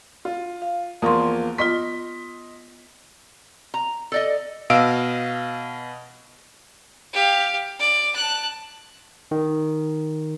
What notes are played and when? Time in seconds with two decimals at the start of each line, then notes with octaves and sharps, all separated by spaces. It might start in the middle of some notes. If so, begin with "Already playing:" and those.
0.25 F4
0.62 F5
1.02 E2 F3 A#3 C6 C#6 D#6
1.58 B3 F4 D#5 C6 B6
3.74 A#5
4.12 A4 D5 D#5
4.70 B2 D#5 F5 E6 D7
7.13 G4 F5
7.79 D5
8.16 A5 F#6
9.31 D#3